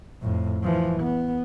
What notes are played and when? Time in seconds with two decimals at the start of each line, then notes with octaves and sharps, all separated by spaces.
0.22 F2 A2
0.63 E3 F3
1.01 B3